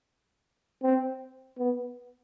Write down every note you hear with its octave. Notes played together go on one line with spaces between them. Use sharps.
C4
B3